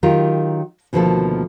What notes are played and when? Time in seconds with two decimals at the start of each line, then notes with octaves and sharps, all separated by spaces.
0.03 D#3 F#3 F4 G4 A#4
0.93 D2 B2 D#3 F3 A#3 A4